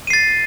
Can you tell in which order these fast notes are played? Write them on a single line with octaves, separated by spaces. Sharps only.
D#7 C7 A6